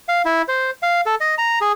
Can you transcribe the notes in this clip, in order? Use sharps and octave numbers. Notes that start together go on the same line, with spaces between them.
F5
E4
C5
F5
A4
D#5
A#5
G#4